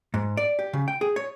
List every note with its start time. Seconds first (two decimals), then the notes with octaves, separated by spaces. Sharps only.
0.14 G#2
0.37 D5
0.59 G4
0.73 C#3
0.88 G5
1.01 G#4
1.16 C#5